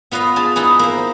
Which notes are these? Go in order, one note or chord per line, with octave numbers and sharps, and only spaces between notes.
B3 F4 B4 D#5 F5
F4 G#4 A5
D#4 E4 G#4 B4
A#3 C5